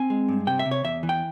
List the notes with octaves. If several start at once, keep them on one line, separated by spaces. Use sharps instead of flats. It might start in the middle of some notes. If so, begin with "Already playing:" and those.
Already playing: C4 G#5
G#3
G2
C3 G5
E5
C3
C#5
E2 E5
E3
G5